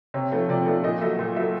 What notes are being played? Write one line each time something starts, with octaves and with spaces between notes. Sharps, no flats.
C3 C#5
F3 A3
C3 D5
F3 A3
A#2 D#5
F#3 A3 E5
A#2
F#3 A3 E5